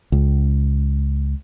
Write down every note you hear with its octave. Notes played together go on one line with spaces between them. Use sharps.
C#2